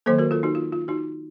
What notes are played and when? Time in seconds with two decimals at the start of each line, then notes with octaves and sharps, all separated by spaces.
0.06 D#3 F#3 A#3 A4 C5
0.18 F#4 A#4
0.31 F4 A4
0.43 D#4 F#4
0.55 F4
0.73 F4
0.88 D#4 F#4